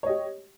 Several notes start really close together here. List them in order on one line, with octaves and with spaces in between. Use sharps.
C#5 D#5 G4